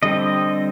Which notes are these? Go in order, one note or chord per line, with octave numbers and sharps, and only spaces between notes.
D3 G3 C4 D#5